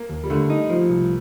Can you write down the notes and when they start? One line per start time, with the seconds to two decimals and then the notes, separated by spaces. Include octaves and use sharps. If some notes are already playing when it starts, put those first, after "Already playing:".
Already playing: A#3
0.10 D#2
0.24 G3
0.30 D3 A3
0.50 D#4
0.70 F3
0.90 C2